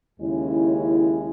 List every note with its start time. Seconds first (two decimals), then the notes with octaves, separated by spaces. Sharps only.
0.20 D#2 C#3 G#3 C#4 E4